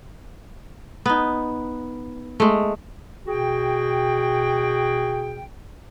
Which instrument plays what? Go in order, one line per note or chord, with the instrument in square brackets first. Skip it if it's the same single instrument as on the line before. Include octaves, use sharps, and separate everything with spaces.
[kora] B3 D#4
G#3 A3
[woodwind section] B2 F#4 G#4 G5